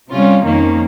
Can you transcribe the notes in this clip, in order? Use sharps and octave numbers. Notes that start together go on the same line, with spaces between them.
C3 G3 C#4 F4
F2 D#3 A#3 C#4